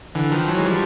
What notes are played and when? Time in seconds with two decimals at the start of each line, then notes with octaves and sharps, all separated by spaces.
0.15 D3 E3
0.32 D#3 F3
0.49 E3 F#3
0.58 G#3
0.65 F3 G3